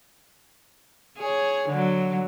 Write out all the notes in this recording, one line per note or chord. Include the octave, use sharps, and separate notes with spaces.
G#4 C#5
D3 F#3